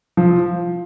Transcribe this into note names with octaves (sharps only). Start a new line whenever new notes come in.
F3